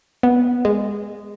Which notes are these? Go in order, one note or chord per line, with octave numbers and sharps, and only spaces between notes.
B3
G#3